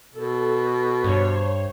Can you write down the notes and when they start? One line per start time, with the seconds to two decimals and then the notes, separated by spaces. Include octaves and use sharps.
0.14 B2 A4
1.04 G2 C5 C#5